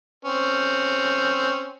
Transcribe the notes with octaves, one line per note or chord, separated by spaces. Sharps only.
C4 C#4